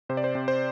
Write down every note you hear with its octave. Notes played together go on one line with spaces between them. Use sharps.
C3 C5
D5
C5
C3
C5